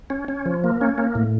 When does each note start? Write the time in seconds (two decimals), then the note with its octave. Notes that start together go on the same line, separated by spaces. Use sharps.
0.10 C#4
0.28 C#4
0.46 F3
0.64 A#3
0.81 C#4
0.98 A#3
1.15 A2